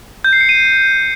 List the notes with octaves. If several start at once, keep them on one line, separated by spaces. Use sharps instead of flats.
G6
C7
C#7
D#7